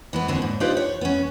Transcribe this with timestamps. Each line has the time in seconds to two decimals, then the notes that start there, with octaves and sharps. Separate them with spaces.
0.13 E3 G#3 B3
0.28 D#2 D3 C4 D4 G#4
0.42 G#2
0.60 D4 D#4 F4 G4 B4 C5
0.77 C#5
1.01 B3 C#4